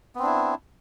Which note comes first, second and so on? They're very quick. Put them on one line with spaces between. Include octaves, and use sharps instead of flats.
B3 C4 D4 E4